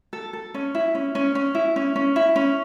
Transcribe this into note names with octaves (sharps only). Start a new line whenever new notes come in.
A4
A4
C#4
E4
C#4
C#4
C#4
E4
C#4
C#4
E4
C#4